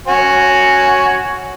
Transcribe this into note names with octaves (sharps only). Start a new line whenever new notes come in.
F#4 C#5 G#5